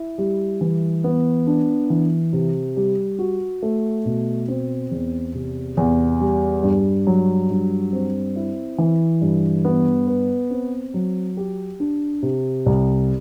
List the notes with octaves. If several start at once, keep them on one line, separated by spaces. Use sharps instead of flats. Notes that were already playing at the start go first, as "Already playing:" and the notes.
Already playing: E4
G3
E3
B3
D4
E3
C3
G3
F#4
A3
B2
C4
E2
C3
E2
G3
G2
F#3
G2
C4
E4
E3
G2
B3
B4
C4
F#3
G4
D4
C3
C2